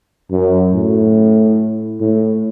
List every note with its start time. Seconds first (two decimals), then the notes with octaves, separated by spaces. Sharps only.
0.31 F#2
0.73 A2
2.00 A2